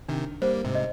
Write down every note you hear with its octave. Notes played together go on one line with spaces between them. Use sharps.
C3 D#3 D4
G3 A#3 C5
G#2 C3
D#5